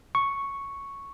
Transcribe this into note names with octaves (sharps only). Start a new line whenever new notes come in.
C#6